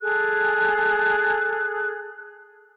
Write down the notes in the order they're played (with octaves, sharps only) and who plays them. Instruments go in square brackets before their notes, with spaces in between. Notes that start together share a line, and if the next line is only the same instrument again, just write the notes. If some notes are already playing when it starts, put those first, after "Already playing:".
[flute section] G#4 A4 F#6